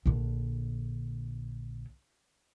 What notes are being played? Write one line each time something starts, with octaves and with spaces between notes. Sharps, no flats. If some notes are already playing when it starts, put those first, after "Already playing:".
A#1 D3